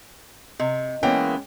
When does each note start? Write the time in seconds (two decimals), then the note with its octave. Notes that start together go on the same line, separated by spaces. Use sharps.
0.60 C3 D#5
1.03 E3 G#3 A#3 B3 C#4 G5